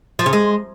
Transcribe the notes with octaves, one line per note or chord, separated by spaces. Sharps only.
F3
C#3
G#3